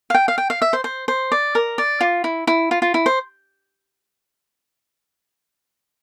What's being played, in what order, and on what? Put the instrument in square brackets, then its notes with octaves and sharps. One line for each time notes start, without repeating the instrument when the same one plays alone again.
[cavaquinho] F5
G5
F5
G5
F5
E5
C5
C5
C5
D5
A#4
D5
F4
E4
E4
F4
F4
E4
C5